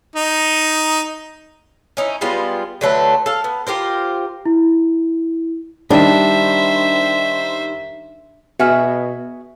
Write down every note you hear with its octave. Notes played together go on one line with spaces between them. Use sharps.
D#4
C#4 D#4 E4
G3 G#3 B3 F4
D3 F#3 A3 B4
A4 F5
B3
F4 G4 A#4 C5
E4
D#3 G3 D4 C5 E5
B2 F#4 G#4 E5 F#5 G#5 F6